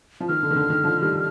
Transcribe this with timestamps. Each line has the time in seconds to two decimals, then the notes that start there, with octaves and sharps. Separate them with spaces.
0.20 F3
0.29 D#3 F6
0.43 D3
0.51 D#3
0.56 D3
0.70 D#3
0.84 D3 F3
1.02 D#3 G3